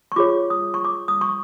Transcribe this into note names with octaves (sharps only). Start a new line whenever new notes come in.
C#6
F4 G#4 C#5 D6
D#6
C#6
D6
D#6
C#6